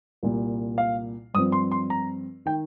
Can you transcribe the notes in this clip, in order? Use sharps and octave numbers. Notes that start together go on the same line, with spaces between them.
C2 A#2 G3
F5
G2 F3 C4 D#6
C6
C6
A#5
D#3 G5